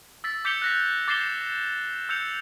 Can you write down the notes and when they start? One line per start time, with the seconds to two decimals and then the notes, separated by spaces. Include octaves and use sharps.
0.24 E6 A6 B6
0.45 D6 G6 B6 C#7 F7 G7
0.62 F#6 A#6 B6
1.08 D6 A6 A#6 C7 E7 G7
2.09 E6 G6 C#7 F7